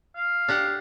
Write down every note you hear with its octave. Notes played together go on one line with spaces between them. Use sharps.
F5
D4 G4 F#5